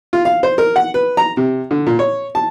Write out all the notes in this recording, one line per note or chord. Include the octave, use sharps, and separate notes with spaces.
F4
F5
C5
A#4
F#5
B4
A#5
C3
D3
A#2
C#5
A5